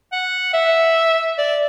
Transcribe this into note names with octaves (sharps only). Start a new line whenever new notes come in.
F#5
E5
D5